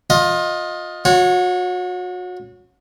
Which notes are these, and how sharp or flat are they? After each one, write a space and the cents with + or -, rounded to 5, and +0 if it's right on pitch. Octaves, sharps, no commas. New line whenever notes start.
F4 +25 D#5 +5
F#4 -35 C#5 +0